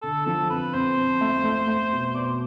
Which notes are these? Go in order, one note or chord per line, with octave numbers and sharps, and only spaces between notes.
D3 A4
F3 A4
F2 B4
F2 C5
F2
A3
A3
A3
B2
B2 D5
C5